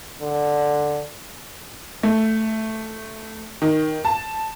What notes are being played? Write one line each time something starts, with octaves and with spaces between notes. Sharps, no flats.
D3
A3
D#3
A5